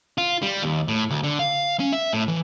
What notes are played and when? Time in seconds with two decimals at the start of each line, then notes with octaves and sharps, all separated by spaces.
0.18 F4
0.42 G3
0.62 D#2
0.88 A2
1.10 D2
1.24 D3
1.39 F5
1.80 C#4
1.93 E5
2.13 A2
2.28 E3